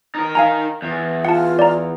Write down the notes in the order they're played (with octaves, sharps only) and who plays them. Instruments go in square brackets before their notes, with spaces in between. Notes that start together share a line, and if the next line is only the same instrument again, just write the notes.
[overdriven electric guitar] D#4 A#4
[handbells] F5 G#5 A#5
[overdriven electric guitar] E2
[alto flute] F4 [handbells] F#5 A5
[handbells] D5 A#5